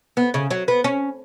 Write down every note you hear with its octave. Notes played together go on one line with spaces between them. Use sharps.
B3
C#3
F#3
B3
C#4